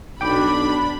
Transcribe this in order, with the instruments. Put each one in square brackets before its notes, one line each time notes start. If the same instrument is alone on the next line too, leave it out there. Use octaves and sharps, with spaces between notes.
[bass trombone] B1 [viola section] D4 [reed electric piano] G5 D6 [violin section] B5